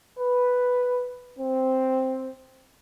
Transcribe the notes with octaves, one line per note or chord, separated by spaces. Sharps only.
B4
C4